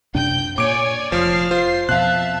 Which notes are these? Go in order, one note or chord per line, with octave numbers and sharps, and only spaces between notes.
F#2 C3 D4 G5 G6
A#2 C#5 D5 G#5 D6 D7
F1 F3 F6 C7
F4 C5 C7
F2 B2 E5 F5 A5 F#6